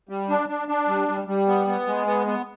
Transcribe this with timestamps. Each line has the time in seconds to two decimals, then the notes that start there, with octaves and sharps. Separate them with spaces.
0.09 G3
0.29 D4
0.49 D4
0.68 D4
0.88 G3
1.08 G3
1.27 G3
1.47 B3
1.67 B3
1.87 G#3
2.07 B3
2.27 B3